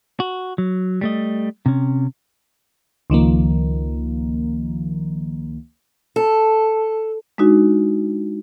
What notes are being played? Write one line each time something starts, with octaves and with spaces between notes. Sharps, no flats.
F#4
F#3
G3 A3 D#5
C3 C#4
C#2 D#3 F3 A#3
A4
G#3 D4 D#4 F#4